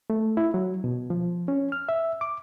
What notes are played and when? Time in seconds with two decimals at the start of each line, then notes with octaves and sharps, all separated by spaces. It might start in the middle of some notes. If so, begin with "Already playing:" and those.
0.10 A3
0.37 E4
0.54 F#3
0.84 B2
1.10 F3
1.48 C#4
1.72 F6
1.89 E5
2.21 D6